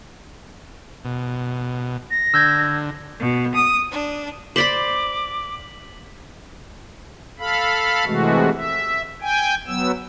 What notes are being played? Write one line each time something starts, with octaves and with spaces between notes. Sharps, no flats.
B2
A#6
D3 E6 G6 G#6
B2
D#6
D4
C5 D5 B5 D6 B6 F#7
A4 F5 B5
C3 E3 G#3 A3 F#4
E5
G5 G#5
F#3 B3 E6